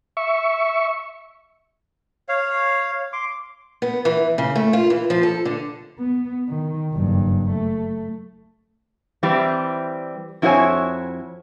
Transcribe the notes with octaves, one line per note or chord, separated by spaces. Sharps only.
E5 C#6
C#5 F5
C6 D6
B3
E3
C#3
A3
F4
E3
F3
A4
D3
B3
D#3
F#1 G2
A3
E3 G3 C4
F2 E4 F#4 C5 C#5 G#5